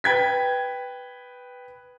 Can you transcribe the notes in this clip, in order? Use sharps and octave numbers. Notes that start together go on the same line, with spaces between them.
B4 G5 G#6 B6